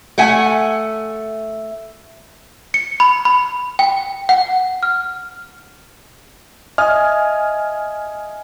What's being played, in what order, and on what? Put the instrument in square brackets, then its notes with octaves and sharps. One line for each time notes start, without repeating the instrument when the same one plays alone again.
[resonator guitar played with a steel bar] A3 E5 F#5 G#5
[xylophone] C#7
B5
B5
G5
F#5
F6
[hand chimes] D#5 E5 D#6 [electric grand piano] G#5 F6